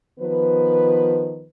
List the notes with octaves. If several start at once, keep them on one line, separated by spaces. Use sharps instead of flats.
D#3 F3 B3 B4